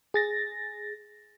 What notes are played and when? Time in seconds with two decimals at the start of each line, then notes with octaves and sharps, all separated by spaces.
0.14 G#4 A6 A#6